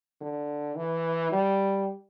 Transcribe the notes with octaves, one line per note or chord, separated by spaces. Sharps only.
D3
E3
G3